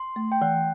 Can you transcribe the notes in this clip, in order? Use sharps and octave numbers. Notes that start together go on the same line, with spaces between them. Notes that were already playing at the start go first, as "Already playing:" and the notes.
Already playing: C6
A3
G5
E3 F#5